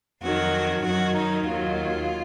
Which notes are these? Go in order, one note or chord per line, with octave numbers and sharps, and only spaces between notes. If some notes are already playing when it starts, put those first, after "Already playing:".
F2 D#3 F#3 F#4
F#2 D#3 F#3 F#4
D#4
D#2 D#3 F#3 F4